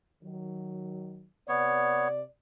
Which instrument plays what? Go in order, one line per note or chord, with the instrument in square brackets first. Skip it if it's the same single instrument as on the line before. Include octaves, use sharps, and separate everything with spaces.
[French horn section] D#3 F#3
[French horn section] C3 D5 [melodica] B3 C#5